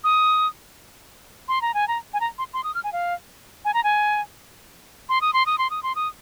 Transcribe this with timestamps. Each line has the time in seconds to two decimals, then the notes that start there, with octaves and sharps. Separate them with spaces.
0.04 D#6
1.48 C6
1.62 A#5
1.74 G#5
1.88 A#5
2.13 G#5
2.20 A#5
2.38 C6
2.53 C6
2.64 D#6
2.75 F6
2.84 G#5
2.92 F5
3.65 G#5
3.74 A#5
3.84 G#5
5.09 C6
5.21 D#6
5.33 C6
5.46 D#6
5.58 C6
5.70 D#6
5.83 C6
5.95 D#6